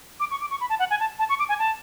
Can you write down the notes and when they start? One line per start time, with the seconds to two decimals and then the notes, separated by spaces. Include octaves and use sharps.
0.20 D6
0.31 C#6
0.41 D6
0.51 C#6
0.61 B5
0.70 A5
0.79 F#5
0.90 G#5
1.00 A5
1.19 A5
1.29 C#6
1.39 D6
1.49 G#5
1.59 A5